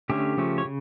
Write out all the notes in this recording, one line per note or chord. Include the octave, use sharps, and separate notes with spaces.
D3 A3 C#4 G4
C#3 F3 A3 C#4
C#5
C#3